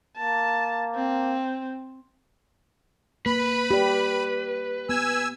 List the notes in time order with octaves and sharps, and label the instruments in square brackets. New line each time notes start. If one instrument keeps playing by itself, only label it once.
[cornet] A#3 [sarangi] A5
[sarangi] C4
[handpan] A#3 [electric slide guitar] B4 [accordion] B5
[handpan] G4 D5
[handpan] B3 [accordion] G#5 E6